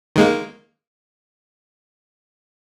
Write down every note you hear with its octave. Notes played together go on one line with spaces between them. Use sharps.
D#3 G#3 A#3